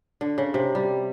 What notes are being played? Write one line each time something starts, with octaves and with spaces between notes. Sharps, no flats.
D3
C#3
C3
G3